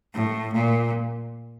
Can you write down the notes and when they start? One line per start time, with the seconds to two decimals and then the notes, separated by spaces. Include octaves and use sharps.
0.14 A2
0.54 A#2